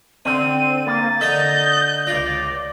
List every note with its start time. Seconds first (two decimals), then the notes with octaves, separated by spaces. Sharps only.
0.25 D3 C4 D#7
0.87 A#3 A6
1.21 D3 A4 D#5 G6
2.07 C#2 F4 D5 A#6